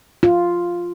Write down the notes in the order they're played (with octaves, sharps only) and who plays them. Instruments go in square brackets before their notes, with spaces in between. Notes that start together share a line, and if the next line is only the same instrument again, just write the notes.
[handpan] F4